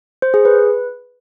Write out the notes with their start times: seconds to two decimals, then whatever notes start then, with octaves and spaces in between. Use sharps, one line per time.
0.22 C5
0.34 G#4
0.45 B4